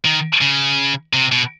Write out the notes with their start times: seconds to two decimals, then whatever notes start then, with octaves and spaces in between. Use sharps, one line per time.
0.05 D#3
0.41 C#3
1.13 C3
1.32 B2